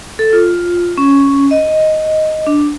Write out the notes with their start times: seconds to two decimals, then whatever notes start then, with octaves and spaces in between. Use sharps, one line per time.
0.19 A4
0.33 F4
0.98 C#4
1.51 D#5
2.47 D4